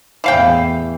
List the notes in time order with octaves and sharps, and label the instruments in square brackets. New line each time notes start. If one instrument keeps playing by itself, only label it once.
[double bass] E2 A2 [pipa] E3 F5 G5